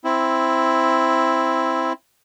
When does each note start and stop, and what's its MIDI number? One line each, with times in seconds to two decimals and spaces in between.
0.04 1.93 60
0.04 1.93 64